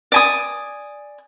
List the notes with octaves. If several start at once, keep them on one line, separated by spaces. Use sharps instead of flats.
D5 G#5 D#6